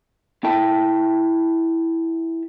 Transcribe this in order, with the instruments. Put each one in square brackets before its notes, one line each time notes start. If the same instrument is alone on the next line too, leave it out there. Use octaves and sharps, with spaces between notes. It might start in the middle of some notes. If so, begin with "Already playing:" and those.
[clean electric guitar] E4 A4 E5 G5 A5